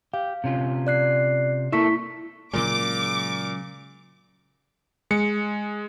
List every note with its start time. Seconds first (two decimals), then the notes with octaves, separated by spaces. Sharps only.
0.14 G4 F5
0.44 C3 C#4 F4
0.87 D5 F#6 C7
1.72 A#3 E4 A4 E5 C#6 B6
2.53 A#2 C#3 F#3 G#3 D6
5.11 G#3 C#7